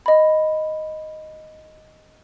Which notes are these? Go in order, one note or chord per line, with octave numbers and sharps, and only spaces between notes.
D#5 B5